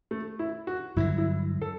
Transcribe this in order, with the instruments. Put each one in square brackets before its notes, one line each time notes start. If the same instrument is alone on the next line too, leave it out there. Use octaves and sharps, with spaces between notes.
[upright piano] A3
E4
F#4
[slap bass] G2 D3 F#3 [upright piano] E4
[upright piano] E4
A4